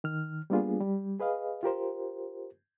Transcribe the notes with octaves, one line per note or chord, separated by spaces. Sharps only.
D#3 F6
G3 A#3 B3 D4 F4 G#4
G3
G#4 B4 D#5 F5
F4 G4 A#4 C5